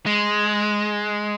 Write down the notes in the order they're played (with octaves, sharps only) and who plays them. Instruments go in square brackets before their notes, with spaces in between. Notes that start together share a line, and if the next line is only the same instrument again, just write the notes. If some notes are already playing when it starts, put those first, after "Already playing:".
[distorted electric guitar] G#3